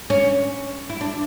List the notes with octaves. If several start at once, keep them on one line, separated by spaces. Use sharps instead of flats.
C#4
E4
D4